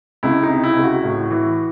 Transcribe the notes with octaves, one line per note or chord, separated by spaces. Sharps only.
C#2 E4
D#4
C3
E4
C#2
F#4
A2
E3